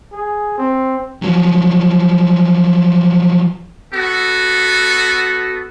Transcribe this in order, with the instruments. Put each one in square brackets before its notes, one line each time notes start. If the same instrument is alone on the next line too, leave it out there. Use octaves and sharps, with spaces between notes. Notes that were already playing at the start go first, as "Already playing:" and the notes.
[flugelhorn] G#4
C4
[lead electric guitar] F3 F#3
[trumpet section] B3 F#4 A4